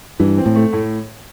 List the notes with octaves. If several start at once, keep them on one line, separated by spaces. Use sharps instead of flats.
G2 E3
C4
A2
A3
A2